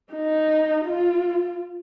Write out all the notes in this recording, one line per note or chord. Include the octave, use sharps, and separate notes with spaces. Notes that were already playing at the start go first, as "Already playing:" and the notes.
D#4
F4